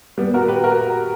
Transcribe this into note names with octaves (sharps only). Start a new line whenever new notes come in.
G3 B3
F#4 A#4
G4 B4
F#4 A#4